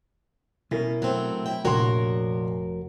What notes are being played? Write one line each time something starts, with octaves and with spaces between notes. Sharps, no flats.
B2 C#4 E4 A#4
F#3 A3 C4
E4 G5
F1 A#1 F#4 A#4 C#5 C6